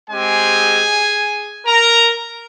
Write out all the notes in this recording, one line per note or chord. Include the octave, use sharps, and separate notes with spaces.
G#3 C4 G4 G#4 G#5
A#4 A#5